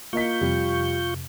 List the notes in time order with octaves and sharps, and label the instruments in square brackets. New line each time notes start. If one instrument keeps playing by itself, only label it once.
[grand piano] A#3 D#5 B6 [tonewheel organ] F4 C#6 G6
[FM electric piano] F2 C3 [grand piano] G3